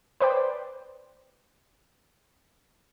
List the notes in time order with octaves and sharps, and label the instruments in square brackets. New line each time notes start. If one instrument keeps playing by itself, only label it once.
[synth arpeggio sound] B4 C5 D5 G5